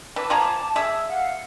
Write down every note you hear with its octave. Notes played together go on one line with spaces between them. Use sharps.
E3 B4 A5 D6
F3 G#5 A#5
G#4 E5
F5 F#5 F6